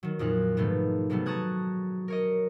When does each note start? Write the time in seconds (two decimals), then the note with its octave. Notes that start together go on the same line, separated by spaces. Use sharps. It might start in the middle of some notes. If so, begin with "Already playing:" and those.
0.03 D#3 F#3
0.19 F2 A#2 D#4 F#6
0.57 G#2 B2 D#3 F3 A3 B3
1.10 C3 F#3 G3 A3 B3
1.26 A5 A#5 C#6 D#6 F#6 G#6
2.08 A#4 C#5 D#5